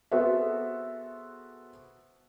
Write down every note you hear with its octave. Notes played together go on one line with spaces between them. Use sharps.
B3 F#4 G#4 A4 C5 E5